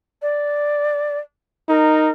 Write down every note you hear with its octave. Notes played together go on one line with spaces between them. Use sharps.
D5
D#4 A#4